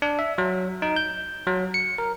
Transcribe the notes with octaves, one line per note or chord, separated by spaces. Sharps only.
D4
E5
F#3
D#4
G6
F#3
C#7
A#4